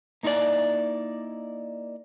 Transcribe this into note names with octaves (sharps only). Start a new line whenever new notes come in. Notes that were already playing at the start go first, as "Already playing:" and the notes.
A#3 D#4 E4 A#4 D5